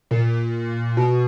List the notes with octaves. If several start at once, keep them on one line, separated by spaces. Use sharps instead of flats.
A#2
B2